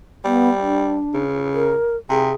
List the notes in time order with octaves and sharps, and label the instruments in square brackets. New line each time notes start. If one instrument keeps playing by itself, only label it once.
[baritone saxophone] G3 [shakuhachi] B3
[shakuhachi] D4
[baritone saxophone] C#3
[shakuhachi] A#4
[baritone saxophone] C3 [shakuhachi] G#4